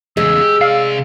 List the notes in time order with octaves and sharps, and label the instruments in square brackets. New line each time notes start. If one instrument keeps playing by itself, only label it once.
[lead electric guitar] E2 C#3 [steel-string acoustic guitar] G#3 [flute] E6
[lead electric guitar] G4
[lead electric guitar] C3 D5 [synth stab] F5